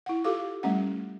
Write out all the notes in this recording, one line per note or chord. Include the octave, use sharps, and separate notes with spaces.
E4 F#5
E4 F4 G4 A4 F5 D6
G3 A3 C#4 F#5